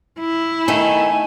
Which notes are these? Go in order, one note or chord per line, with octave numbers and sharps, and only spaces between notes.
E4
D#3 A3 G#5